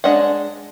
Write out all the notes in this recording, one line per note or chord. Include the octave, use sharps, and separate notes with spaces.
G#3 D4 D#5 F#5